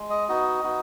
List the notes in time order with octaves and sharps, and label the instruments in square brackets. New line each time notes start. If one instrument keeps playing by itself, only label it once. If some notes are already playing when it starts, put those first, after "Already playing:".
Already playing: [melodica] G#3
D#5
B3 D#4 F#4 D#5
B3 D#4 F#4